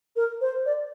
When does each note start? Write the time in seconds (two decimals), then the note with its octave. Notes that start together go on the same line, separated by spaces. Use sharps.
0.16 A#4
0.41 C5
0.66 D5